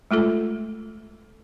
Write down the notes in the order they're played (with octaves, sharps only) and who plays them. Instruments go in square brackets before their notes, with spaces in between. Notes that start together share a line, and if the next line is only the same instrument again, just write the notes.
[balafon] G#3 A3 F4 A4